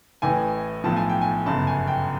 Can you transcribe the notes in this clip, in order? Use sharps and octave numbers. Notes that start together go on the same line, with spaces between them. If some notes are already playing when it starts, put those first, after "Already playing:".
A1 A2 E3 G#5
B1 A2 F3 A5
G#5
G5
G#5
G1 F#2 C#3 A5
G#5
G5